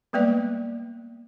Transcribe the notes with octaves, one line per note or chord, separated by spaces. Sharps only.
G3 G#3 A#3 B3 B4 D5